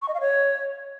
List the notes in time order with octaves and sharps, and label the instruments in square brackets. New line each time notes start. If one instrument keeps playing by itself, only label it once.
[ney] C#6
D#5
F5
C#5